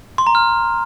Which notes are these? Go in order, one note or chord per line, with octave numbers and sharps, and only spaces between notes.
C6
A#5
F6